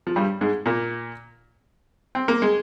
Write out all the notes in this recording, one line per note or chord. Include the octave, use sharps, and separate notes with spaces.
F3
G2 G3
G#2 G#3
A#2 A#3
C4
A#3
G#3